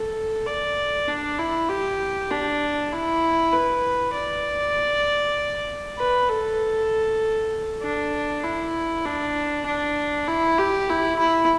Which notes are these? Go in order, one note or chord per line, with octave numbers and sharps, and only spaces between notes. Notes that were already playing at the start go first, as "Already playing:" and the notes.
Already playing: A4
D5
D4
E4
G4
D4
E4
B4
D5
B4
A4
D4
E4
D4
D4
E4
G4
E4
E4